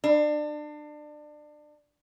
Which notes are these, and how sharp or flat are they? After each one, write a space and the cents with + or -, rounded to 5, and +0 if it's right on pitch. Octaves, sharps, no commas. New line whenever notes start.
D4 +30